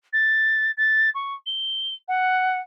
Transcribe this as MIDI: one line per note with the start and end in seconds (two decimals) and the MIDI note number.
0.13 0.71 93
0.77 1.10 93
1.15 1.34 85
1.46 1.94 103
2.08 2.59 78